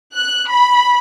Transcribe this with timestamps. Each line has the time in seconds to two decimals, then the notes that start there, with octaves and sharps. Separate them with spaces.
0.15 F#6
0.48 B5